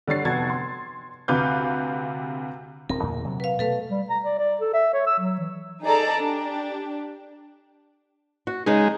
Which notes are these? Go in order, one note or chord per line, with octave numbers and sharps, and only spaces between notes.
D3 G3 C#5 A6 C7
F1 B3 F#4 A5 G#6 A6
C6
D2 C3 B4 F5 D6 G6
D1 C4 A#4
E2 A#2 D3
C3 F#3
B4 F5
B2 A3 A4 B4 F5
G3
A#5
D5
D5
A4
E5
C#5
E6
F#3
E3
D#4 G#4 A4 D5 A5 A#5
D4 G4
F#4
C#3 G#3 D#4 G#4